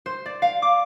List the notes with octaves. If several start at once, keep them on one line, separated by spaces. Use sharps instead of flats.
C5
D5
F5
D6